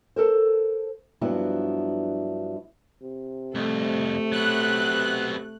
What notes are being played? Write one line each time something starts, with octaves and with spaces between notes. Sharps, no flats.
A4 A#4 C5
G2 F3 F#3 B3 D4 E4
C3
C2 F2 A3
F#3 B3 F#6